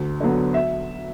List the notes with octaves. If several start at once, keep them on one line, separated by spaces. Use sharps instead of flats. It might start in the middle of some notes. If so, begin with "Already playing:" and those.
Already playing: D2
D3 F#3 B3
E5